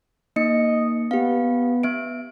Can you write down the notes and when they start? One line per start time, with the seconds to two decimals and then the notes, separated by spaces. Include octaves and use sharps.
0.36 A#3 D#4 D#5 C#7
1.11 B3 G4 F5
1.83 B3 E5 D7